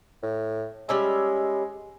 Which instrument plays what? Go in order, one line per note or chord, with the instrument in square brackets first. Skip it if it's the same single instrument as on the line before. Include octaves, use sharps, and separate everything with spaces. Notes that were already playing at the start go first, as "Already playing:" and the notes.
[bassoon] A2
[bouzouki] G3 C#4 E5 [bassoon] G#3